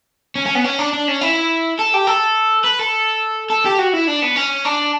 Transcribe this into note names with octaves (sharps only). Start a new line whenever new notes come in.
C#4
C#4
B3
C#4
D4
D4
C#4
E4
A4
G4
A4
B4
A4
A4
G4
F#4
E4
D4
B3
C#4
D4